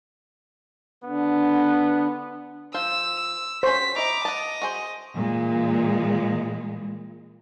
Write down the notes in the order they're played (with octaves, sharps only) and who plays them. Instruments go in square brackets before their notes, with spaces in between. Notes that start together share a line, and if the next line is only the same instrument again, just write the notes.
[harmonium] D3 [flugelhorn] B3
[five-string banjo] F3 C5 F5 [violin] E6
[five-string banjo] C#4 F#4 [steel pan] C5 [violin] B6
[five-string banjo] E4 D#5 [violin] A#5 D6
[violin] D#5 [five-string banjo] F#5 A5
[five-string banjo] F#4 G#4 C5
[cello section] A#2 E3 G#3